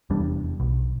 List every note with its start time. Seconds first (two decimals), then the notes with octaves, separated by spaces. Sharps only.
0.10 F1 E2 G3 D4
0.60 B1